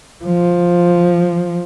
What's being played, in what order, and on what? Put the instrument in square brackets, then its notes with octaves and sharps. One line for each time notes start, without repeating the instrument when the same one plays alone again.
[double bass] F3